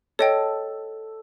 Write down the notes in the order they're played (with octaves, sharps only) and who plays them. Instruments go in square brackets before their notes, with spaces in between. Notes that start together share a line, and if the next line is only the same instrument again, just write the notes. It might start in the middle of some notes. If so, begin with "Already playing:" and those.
[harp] A4 [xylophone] C#5 D#5 G5